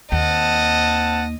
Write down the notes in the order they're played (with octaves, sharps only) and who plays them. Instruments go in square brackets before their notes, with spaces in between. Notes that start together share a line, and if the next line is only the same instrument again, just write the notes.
[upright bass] D#2 [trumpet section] C4 F#5 A5 [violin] D#5